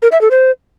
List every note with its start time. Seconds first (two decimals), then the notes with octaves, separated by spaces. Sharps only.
0.02 A#4
0.12 E5
0.21 A4
0.31 C5